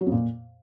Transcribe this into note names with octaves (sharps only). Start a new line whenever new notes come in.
F#3
F2
A#2